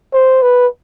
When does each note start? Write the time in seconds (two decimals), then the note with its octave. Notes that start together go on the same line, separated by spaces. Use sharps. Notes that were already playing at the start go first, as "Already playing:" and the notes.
0.13 C5
0.42 B4